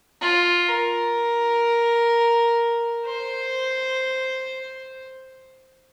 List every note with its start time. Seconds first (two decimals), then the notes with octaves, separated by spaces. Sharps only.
0.21 F4
0.69 A#4
3.06 C5